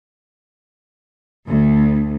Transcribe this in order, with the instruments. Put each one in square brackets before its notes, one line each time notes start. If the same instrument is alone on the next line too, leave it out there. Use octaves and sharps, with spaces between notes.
[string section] D2